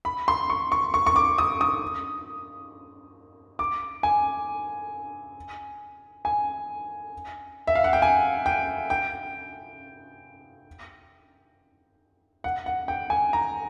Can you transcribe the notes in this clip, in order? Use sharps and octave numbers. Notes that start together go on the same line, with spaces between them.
B5
C6
C#6
C#6
C#6
C#6
D6
D#6
D#6
D6
G#5
G#5
E5
F5
F#5
G5
G#5
G5
G5
F#5
F#5
G5
G#5
A#5